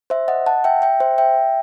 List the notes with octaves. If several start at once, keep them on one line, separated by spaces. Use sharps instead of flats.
C5 E5
D#5 F#5
F#5 A5
E5 G5
E5 G5
C5 E5
E5 G5